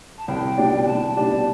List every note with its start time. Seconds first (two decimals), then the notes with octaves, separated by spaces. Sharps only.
0.18 A5
0.28 C2 G5
0.58 B2 G3 D4 G4
0.86 C2 A5
1.16 B2 G3 D4 G4 A5